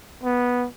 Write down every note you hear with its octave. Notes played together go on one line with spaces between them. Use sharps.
B3